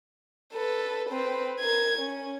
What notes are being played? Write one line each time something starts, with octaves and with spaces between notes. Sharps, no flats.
A4 B4
C4 B4
A#4 G#6
C#4